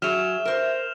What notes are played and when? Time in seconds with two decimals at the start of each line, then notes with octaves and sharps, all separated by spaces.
0.02 F#3 G#4 E5 F6 E7 F7
0.45 A#4 C5